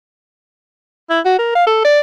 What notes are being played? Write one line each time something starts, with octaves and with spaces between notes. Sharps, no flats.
E4
F#4
A#4
F5
A4
D5